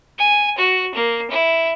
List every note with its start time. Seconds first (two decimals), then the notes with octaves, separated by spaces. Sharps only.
0.19 G#5
0.58 F#4
0.95 A#3
1.31 E4